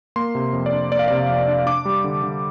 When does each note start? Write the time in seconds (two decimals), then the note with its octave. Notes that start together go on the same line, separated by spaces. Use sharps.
0.16 A#3 C6
0.35 C3
0.53 F2
0.66 D5
0.73 D4
0.91 A#3 D5
0.99 F5
1.08 C3 D5
1.29 F2
1.48 D4
1.66 D4 D6
1.85 G3
2.04 D3
2.23 D3